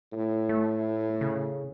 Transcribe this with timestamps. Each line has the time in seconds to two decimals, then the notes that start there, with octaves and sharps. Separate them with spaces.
0.13 A2
0.49 A3
1.21 C#3